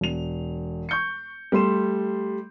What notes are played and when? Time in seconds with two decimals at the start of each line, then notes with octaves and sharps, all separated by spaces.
0.01 E1 F7
0.89 C#6 G6 C#7
1.52 G3 A3 C6 E7